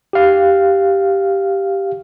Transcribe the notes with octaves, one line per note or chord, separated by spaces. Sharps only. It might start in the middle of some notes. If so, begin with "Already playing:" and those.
G4 F5